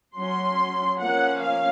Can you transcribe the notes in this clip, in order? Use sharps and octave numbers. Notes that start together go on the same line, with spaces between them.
F#3 C#4 C6
F3 A#3 C#4 F#5
F5